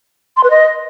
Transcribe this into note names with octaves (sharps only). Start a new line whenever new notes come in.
C6
B4
D#5